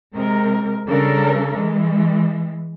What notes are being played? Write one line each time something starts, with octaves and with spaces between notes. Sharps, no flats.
C3 G#3 A#4
C#3 G3 D4 A4 A#4
E3 G#3